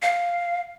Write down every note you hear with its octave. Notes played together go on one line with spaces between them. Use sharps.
F5